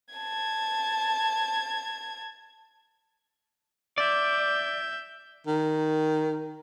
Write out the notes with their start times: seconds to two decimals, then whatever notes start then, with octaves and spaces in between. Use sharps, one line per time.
0.15 A5 G#6
3.98 D5 E5 G6
5.47 D#3